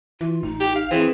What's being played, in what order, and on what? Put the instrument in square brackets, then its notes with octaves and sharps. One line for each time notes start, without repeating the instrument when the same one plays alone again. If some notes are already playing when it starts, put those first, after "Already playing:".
[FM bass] E3 [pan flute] F4
[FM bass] A1 [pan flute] D#4
[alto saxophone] G4
F5
[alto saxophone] E3 [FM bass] C4 [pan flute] G#4